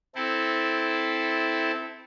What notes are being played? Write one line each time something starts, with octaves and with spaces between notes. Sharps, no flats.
C4 E4 A4